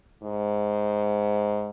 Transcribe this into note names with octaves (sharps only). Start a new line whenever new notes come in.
G#2